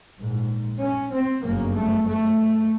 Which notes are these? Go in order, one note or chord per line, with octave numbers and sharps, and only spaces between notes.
A#1 G#2
C#4
C4
G1 F#2 C#3 A#3
A3
A3